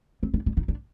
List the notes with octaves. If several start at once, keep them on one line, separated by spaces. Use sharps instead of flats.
C4
D4
D4
D#4
D4